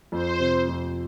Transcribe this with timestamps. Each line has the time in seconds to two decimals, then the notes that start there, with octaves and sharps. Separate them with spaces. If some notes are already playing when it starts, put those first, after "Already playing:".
0.12 F2 C5
0.40 C3
0.68 F2